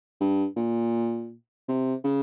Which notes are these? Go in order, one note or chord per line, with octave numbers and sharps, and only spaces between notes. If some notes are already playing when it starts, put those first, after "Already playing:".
G2
A#2
C3
C#3